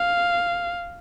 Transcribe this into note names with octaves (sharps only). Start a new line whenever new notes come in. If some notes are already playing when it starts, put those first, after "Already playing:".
Already playing: F5